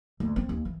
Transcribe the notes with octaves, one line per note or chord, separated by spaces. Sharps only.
D2
C4
D#2
E3